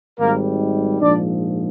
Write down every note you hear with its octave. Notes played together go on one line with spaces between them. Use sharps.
G#1 G#2 D#3 G3 A#3 A#4
A#1 G#2 F3 D4 D5